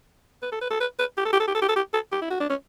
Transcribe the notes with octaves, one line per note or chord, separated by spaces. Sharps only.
B4
A4
B4
A4
B4
B4
G4
A4
G4
A4
G4
A4
G4
A4
G4
A4
G4
E4
F#4
D4
C#4